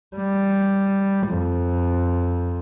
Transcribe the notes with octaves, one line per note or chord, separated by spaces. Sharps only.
G3
F2